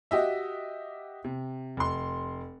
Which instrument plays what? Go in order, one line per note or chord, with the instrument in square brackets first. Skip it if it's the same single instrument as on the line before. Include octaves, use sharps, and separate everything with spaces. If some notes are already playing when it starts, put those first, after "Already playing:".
[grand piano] F#4 G4 D#5 E5
C3
F1 C6